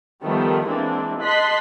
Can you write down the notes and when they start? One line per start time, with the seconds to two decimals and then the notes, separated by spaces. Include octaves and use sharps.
0.23 D#3 F3 G3 A3 B3
0.67 E3 G#3 A#3 C4 D4
1.21 D#5 A5 C6 F#6 B6